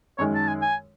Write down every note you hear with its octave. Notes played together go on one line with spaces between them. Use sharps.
F#2 D#3 G#3 C#5
A5
G#5
G#5